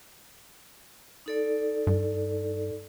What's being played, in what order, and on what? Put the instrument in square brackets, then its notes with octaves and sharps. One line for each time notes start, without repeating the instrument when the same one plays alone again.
[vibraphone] D#4 A4 D5
[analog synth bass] G2